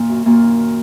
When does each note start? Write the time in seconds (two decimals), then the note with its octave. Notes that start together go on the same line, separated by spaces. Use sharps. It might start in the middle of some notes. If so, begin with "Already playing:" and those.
Already playing: A#2 D#3 A#3
0.09 F#2
0.25 F#2 A#2 A#3
0.43 D#3
0.59 D#3